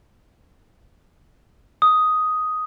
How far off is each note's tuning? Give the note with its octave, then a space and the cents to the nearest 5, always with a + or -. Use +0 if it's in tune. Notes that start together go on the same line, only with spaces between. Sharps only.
D#6 +5